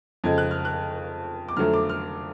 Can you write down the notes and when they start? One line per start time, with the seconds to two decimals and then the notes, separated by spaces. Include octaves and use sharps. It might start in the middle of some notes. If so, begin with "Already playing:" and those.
0.24 F2 C#3 G#3 G#6
0.38 F#6
0.51 F6
0.65 F#6
1.49 D6
1.56 F2 D3 F#3 A3 F6
1.74 D6
1.89 F6